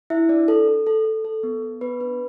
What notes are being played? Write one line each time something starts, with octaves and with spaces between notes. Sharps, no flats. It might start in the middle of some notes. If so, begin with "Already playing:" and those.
D4 E4 E5
D4 D5
A4
A4
A4
A4
A4
B3
B3
B3 B4
D4 B4